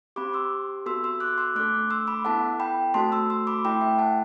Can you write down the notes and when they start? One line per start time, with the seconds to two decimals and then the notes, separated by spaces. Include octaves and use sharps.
0.16 C4 G4 B5 D6
0.33 C6 E6
0.86 B3 F#4 A4 C6 E6
1.04 C6 E6
1.20 D6 F#6
1.38 C6 E6
1.55 A3 D4 A4 D6 F#6
1.91 C6 E6
2.07 B5 D6
2.25 B3 E4 A4 F#5 A5
2.60 G5 B5
2.94 A3 C4 F#4 A4 A5 C6
3.12 C6 E6
3.30 C6 E6
3.47 B5 D6
3.65 A3 E4 A4 G5 B5
3.81 E5 G5
3.99 F#5 A5